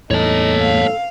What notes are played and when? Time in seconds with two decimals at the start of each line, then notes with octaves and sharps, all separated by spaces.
0.11 E2 A2 D#4 A4 C#5 A5
0.60 F5